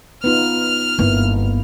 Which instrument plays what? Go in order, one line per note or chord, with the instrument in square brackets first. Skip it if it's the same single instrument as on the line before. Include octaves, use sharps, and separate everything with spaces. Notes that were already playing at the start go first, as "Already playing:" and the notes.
[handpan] B3 D#4 F4 [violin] F6
[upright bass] G1 [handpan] A#3 B3 E4